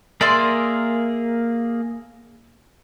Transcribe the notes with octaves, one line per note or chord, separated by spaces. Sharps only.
A#3 G#4 A#4 D5 E5 C6